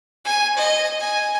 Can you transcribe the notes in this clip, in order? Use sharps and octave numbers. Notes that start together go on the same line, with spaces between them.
G#5
D#5
G#5